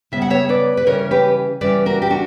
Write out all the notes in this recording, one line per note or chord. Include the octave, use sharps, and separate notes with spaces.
C#3 G3 B3 E5
F#5
C#5 E5
B4 D5
B4
C#3 E3 G3 C#4 A#4 C#5
G4 B4
C#3 E3 G3 C#4 B4 D5
F#4 A#4
G4
D4 F#4